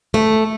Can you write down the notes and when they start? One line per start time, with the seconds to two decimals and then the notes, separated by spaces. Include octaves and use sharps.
0.14 A3